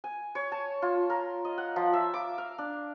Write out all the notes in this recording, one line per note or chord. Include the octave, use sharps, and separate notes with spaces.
G#5
C#5
A5
F4
A#4
D#5
F#5
F3
E5
D6
F5
D4